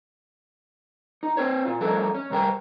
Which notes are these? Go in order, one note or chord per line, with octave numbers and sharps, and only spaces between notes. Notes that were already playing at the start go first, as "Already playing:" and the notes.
D#4
C4 C5 C#5
A#2 F4
F3 G3 A3 C#4 A4 A#4
C#4
G2 C3 G3 A#4 G5